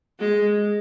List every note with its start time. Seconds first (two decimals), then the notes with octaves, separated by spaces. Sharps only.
0.19 G#3